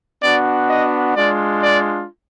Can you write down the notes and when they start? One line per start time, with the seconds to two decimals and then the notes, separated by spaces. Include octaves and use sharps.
0.21 B3 D4 F#4 D5
0.68 D#5
1.15 G#3 D4 F4 D5
1.62 D5